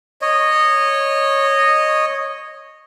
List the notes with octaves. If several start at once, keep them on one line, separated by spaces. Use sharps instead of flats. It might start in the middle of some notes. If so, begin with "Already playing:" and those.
C#5 D#5